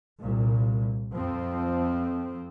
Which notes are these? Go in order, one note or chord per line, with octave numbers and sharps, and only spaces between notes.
C2 A#2
F2 F3 C4